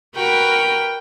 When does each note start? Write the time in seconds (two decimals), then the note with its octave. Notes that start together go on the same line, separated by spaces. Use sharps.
0.16 F#4 A#4 B4 G5